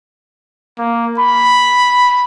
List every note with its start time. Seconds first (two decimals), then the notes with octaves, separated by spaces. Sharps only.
0.78 A#3
1.19 B5